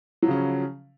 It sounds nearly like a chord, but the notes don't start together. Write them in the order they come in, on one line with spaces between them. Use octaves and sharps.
F#3 F3 C#3 C#4